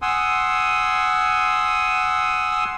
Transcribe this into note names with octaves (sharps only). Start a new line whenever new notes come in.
F#5 G#5 C6 D#6 E6